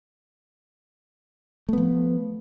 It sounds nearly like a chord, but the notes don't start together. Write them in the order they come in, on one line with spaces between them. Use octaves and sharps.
A3 B3 F3